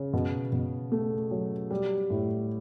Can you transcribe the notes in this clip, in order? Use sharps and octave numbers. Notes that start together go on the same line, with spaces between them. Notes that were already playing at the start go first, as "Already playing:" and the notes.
Already playing: C#3
B2
B2
A3
F#3
G3
A2